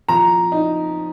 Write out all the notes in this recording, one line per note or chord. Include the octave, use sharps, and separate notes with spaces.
F3 A#5
D#4